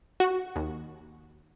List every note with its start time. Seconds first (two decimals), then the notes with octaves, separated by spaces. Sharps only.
0.20 F#4
0.56 D#2